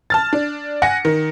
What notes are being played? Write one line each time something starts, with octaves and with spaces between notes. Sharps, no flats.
A5 F6 A6
D4
F#5 G#5 A#6 C#7
D#3